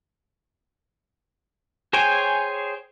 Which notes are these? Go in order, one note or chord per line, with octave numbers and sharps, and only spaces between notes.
G#4 C5 C#5 G5 G#5